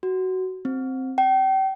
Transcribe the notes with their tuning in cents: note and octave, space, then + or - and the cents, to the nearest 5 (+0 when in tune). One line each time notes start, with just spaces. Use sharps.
F#4 +10
C4 +0
G5 -35